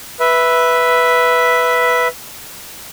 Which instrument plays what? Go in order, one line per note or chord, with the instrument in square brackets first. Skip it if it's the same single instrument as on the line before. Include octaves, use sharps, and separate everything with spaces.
[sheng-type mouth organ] B4 E5